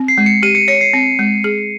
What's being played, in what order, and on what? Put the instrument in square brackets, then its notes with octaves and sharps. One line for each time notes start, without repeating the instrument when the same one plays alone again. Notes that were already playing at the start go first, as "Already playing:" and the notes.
Already playing: [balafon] C4
[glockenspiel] C7
[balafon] G#3
[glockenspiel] C#7
[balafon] G4 [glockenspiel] D#7
[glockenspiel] C#7
[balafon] C#5 [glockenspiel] C#7
[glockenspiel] C7
[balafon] C4
G#3
G#4